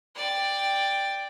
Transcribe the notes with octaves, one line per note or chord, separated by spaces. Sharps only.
D5 G5